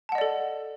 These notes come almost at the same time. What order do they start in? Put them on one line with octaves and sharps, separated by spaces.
A5 F#5 D#5 D5 A4